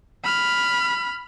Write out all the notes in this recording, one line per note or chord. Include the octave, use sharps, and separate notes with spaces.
B5 F6